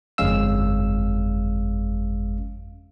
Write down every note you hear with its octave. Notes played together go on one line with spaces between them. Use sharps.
G1 F2 G#3 C#4 F5 E6